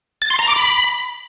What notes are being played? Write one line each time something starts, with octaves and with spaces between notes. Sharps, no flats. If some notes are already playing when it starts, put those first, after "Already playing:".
A6
C6
A#5
D6
B5